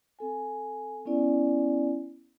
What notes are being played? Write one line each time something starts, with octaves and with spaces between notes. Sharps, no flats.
C4 A4 G#5
B3 C#4 E4 D5 G#5